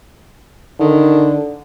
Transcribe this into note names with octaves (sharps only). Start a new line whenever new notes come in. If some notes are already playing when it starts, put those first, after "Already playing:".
D3 D#3